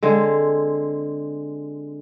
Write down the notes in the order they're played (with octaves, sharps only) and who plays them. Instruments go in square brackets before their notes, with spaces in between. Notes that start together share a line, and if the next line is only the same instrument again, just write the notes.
[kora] D3 G#3 C4